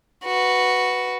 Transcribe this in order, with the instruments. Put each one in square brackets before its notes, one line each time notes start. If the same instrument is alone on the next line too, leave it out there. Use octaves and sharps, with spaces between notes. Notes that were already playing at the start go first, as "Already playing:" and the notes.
[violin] F#4 B4